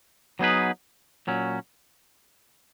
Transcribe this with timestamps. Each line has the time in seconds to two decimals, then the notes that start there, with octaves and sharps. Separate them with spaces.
0.39 F#3 B3 D#4 G#4 B4
1.27 A#2 F#3 C#4